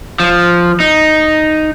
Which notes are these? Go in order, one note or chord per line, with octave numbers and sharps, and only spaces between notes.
F3
D#4